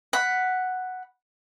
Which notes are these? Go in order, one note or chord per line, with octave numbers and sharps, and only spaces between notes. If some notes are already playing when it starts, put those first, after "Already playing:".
F#5 B5